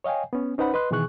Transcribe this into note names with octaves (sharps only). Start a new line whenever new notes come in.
C#5 D#5 F5 G5 G#5
B3 C#4
C#4 D#4 B4 C5 F#5 B5
B4 D#5 C6 F#6
B2 D#3 E3 G#4 C#6 F#6